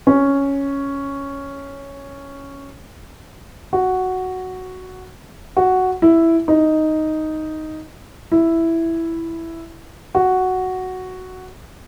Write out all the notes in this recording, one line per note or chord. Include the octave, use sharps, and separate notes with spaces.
C#4
F#4
F#4
E4
D#4
E4
F#4